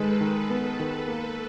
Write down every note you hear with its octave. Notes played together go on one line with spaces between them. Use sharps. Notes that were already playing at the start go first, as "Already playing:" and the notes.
Already playing: D#3 G#3 A4 B4
D#3
B3
D#3
A#3